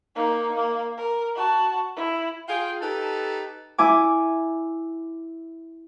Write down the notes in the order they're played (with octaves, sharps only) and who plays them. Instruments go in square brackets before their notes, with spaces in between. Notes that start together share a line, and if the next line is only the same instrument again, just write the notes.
[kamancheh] A#3 D#4
A#3
A#4
F#4 A5
E4
[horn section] F4 G#4 G5
D#4 G4 A4 B4 A5 A#5
[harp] E4 G#5 D6